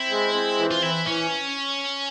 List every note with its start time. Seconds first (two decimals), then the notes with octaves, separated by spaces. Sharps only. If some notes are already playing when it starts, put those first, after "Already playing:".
Already playing: C4 E4
0.11 G#3
0.34 C4
0.59 E3
0.71 F4
0.82 E3 E4
1.07 E3 C#4